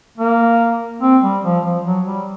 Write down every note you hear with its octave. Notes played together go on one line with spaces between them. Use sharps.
A#3
C4
G3
F3
F3
F#3
G3